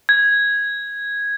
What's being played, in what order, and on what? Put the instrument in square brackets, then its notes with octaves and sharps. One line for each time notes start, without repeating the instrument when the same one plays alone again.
[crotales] G#6